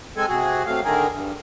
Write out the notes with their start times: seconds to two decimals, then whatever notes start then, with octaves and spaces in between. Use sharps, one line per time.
0.17 G#3 C4 A4 G#5
0.29 C3 F#4 G#4
0.66 C3 F#3 A3 F5
0.84 D3 D#3 A3 G#4 A#4
1.13 G2